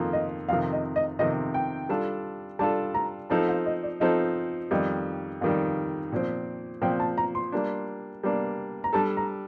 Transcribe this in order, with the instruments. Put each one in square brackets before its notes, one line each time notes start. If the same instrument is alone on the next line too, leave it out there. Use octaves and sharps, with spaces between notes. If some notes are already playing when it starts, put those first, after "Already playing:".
Already playing: [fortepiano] F2 D#3 A#3 F4 A4
[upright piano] D#5
[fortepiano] F2 C3 D#3 [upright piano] F5
[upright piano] D#5
D#5
[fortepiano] F2 C3 D#3 [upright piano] D#5
[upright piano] G5
[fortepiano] G3 D4 F4 A4
[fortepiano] G3 D4 F4 A4 [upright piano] A5
[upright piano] A#5
[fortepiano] F3 C4 D#4 A4 [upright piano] A5
[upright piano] F5
D#5
D5
[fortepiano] F3 C4 D#4 A4 [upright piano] D#5
[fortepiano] F2 D#3 G3 [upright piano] D#5
[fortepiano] F2 D#3 G3 [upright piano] F5
[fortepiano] A#2 F3 C4
[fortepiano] A#2 F3 C4 [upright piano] G5
[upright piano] A5
A#5
C6
[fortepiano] G3 A#3 D4
G3 A#3 D4
[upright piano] A#5
[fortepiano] G3 D4 A4 [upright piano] A5
[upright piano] A#5